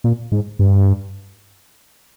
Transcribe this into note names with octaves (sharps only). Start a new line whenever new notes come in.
A#2
G#2
G2